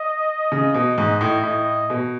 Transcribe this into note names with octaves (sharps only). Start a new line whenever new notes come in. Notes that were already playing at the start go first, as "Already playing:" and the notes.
Already playing: D#5
C#3
B2
G#2
A2
A2 D#5
B2